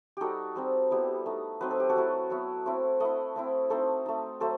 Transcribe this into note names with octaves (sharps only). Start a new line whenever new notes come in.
G3 D#4 F#4 G4 A4
G3 C4 D#4
G3 B3 E4
A3 D#4
F#3 C4 D#4 B4
A4
G4
F#4 A4
F#3 A3 E4
F#3 B3 E4
A3 C4 E4
A3 E4 D#5 F#5
A3 C4 E4
A3 C4 D#4 A4 C5
A3 D#4
F#3 A3 A4 C5